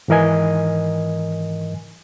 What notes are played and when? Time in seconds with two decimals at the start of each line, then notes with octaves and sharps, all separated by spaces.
0.08 G#2 D#3 E3 A#4 D#5 G#5